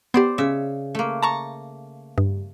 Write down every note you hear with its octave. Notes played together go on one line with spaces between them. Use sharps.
B3 G4 C5 D5
C#3 E5
A3 A#3
A5 A#5 C#6
G2